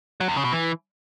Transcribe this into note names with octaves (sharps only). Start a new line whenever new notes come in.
F#3
E2
C#3
B2
E3